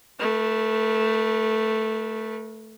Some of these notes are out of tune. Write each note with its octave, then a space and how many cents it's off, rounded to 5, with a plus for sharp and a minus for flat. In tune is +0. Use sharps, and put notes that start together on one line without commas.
A3 +0 B4 -45